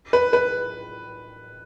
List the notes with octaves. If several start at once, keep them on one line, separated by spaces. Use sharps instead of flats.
B4
B4